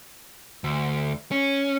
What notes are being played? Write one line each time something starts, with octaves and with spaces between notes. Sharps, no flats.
D2
C#4